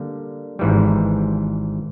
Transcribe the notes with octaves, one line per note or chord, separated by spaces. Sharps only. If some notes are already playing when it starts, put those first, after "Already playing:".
Already playing: D3 G3 A#3
G#1 G#2 E3 G3